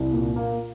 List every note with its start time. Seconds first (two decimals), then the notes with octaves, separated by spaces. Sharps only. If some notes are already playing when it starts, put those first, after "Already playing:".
Already playing: C2
0.12 A#2
0.36 A#3